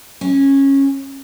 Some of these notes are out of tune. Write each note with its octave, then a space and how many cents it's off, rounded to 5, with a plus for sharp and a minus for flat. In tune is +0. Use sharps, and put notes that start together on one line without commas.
C#4 -15